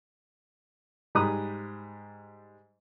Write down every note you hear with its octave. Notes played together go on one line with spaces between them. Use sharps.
G#2 G3 A#5 B5 D#6 F#6